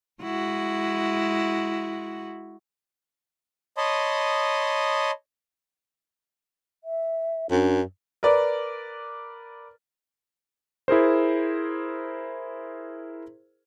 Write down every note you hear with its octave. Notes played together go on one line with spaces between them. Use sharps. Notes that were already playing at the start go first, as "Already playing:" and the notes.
G#3 E4 F#4
C#5 D#5 A5 B5 C6 D#6
E5
F#2 D4
A#4 B4 D5
E4 G#4 A#4 C5